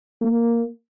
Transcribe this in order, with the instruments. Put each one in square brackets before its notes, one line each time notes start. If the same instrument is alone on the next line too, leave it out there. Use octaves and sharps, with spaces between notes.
[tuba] A#3